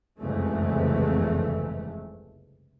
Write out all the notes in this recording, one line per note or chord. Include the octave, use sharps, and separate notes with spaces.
F#1 C2 F2 G#2 E3 A3